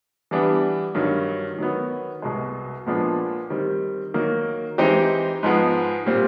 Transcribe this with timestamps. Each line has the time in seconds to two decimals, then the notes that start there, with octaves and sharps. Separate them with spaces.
0.31 E3 G3 B3 D4
0.95 G2 D#3 F#3
1.59 D#3 F#3 B3
2.22 C2 B2 G#3
2.86 A#2 F3 G#3 B3 D4
3.50 D#3 G3 C4
4.14 D#3 F#3 A#3
4.78 E3 G#3 C4 D#4 G4
5.43 G#2 F3 G#3 B3
6.06 A#2 G3 C4